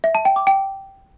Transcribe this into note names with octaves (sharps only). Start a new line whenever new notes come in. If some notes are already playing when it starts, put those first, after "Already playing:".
E5
A5
G5
D6
G5